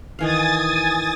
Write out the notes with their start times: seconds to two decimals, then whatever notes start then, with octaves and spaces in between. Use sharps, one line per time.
0.19 D#3 E3 F5 G#5 D#6 A6